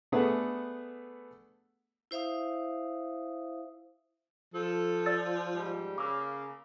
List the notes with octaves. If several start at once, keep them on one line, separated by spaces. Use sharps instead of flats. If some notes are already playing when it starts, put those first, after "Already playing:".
A3 B3 D4 G#4 B4 F#5
E4 C5 E5 F5 D#6
F3 A4
D5 E6 A6
G#2 G3
C#3 A#3 D6 E6